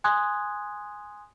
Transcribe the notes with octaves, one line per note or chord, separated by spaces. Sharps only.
G#5 C6 D#6 F#6 G#6